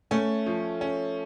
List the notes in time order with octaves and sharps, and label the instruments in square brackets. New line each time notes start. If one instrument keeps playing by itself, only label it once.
[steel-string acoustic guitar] A3 [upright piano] C#4
[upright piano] F3
C#4